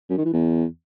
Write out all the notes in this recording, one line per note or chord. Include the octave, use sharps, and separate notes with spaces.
F#2
D#3
E3
E2